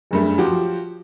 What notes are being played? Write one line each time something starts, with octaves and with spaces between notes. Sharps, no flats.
F#1 G2 A3
F3 F#3 F#4 G4